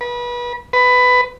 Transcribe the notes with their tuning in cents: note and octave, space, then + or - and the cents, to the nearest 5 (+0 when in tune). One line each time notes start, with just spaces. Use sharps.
B4 -30
B4 +15